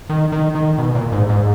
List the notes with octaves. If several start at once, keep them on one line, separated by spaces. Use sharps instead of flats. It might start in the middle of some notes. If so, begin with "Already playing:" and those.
D#3
D#3
D#3
B2
A#2
G#2
G#2